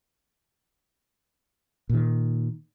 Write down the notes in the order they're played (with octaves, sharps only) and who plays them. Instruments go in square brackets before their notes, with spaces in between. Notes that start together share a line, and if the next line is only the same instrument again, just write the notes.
[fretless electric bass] A#2 D#3